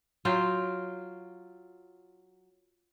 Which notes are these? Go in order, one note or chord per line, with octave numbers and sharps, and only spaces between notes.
F#3 F4 F5 G5